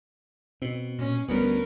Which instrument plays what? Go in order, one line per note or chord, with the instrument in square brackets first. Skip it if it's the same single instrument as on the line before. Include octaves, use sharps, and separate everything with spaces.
[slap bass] B2 [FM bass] C4
[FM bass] A#2 [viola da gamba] C#4
[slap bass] D2 G3 [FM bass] B3 [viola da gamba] C#4 A#4 B4